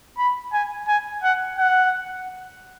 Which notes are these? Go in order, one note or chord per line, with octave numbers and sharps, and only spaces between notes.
B5
G#5
G#5
F#5
F#5